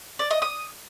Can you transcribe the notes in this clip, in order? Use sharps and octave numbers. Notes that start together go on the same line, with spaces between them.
D5
D#5
D#6